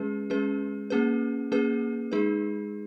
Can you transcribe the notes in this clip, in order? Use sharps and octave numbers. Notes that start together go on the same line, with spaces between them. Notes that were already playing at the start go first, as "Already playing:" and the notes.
Already playing: G#3 C#4 G#4 B4
G#3 C#4 G#4 B4
A#3 C#4 G#4 B4
A#3 C#4 G#4 B4
G#3 D#4 G#4 B4